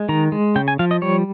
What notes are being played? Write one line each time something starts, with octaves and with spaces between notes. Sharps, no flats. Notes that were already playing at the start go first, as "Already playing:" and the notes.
Already playing: G#3
D#3 A#5
G#3
C#3 G5
G#5
F3 F5
D#5
G3 C#5